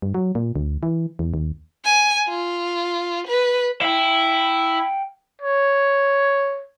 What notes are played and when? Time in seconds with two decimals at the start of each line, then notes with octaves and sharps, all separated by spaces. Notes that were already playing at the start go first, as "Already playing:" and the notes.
0.02 G2
0.14 F#3
0.35 A#2
0.56 D2
0.83 E3
1.19 E2
1.34 D#2
1.84 G#5
2.28 F4
3.27 B4
3.81 E4 F5 G5
5.41 C#5